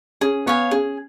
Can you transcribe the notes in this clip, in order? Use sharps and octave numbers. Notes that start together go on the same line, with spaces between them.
C#4 G#4
B3 C#5 F5 G#5
C#4 G#4